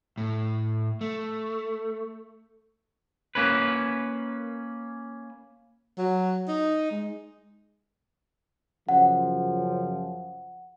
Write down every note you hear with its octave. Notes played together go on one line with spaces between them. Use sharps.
A2
A3
A#3 C#4 B4
F#3
D#4
G#3
F#2 C#3 F3 F#5